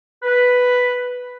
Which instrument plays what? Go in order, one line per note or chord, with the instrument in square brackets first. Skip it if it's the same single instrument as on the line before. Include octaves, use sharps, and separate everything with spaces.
[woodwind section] B4